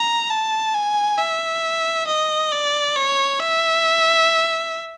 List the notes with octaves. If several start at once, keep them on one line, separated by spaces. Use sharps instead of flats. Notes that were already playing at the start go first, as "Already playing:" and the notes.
Already playing: A#5
A5
G#5
E5
D#5
D5
C#5
E5